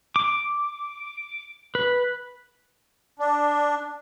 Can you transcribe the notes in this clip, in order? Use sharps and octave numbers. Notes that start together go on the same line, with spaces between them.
D6
B4
D4